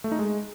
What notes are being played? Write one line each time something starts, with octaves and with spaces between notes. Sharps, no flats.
A3
D#4
G#3